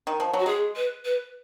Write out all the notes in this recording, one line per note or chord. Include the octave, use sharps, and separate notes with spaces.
D#3
F3
F#3
F#4
G#3 G#4
B4
B4